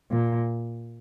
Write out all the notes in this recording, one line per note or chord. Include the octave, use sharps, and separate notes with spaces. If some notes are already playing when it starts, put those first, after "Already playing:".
A#2